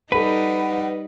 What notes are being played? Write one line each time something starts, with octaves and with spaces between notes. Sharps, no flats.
G3 D#4 A4 B4 F#5 B5